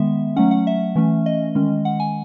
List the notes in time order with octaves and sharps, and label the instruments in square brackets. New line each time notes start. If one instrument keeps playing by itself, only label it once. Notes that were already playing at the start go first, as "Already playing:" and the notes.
Already playing: [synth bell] D#3 G#3 B3 E5
F#3 A3 C#4 F#5
F#5
E5
E3 A3 C#4
D#5
D#3 G#3 C#4
F#5
G#5